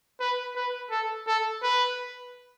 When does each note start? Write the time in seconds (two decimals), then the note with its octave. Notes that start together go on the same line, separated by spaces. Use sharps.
0.20 B4
0.56 B4
0.91 A4
1.27 A4
1.63 B4